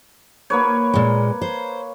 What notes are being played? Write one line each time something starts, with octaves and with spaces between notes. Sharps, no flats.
A#3 B4 C#5
A#2 G#3
C5